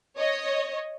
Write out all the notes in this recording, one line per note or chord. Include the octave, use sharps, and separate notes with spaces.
C#5 D#5